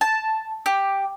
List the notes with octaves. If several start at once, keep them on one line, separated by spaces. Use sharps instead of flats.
A5
G4